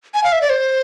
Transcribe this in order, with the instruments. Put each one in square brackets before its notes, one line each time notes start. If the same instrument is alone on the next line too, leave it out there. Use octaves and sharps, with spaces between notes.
[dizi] G#5
F5
E5
D5
C5